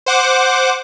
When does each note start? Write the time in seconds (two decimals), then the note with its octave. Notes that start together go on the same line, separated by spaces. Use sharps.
0.06 C5 F#5 D6